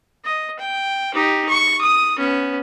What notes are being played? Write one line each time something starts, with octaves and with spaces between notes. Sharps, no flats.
D#5
G5
D#4 G4
C#6
D#6
B3 C#4